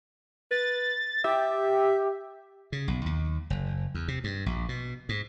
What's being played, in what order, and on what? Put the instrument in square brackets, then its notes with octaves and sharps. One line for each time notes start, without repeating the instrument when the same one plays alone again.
[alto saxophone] B4 [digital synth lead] A6
[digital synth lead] G4 [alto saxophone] E5
[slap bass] C#3
B1
D#2
F#1
E2
C3
G2
A#1
B2
G#2